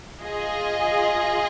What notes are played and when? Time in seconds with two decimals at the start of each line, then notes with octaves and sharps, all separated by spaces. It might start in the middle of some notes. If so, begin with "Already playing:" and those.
0.23 F4 G#4 D#5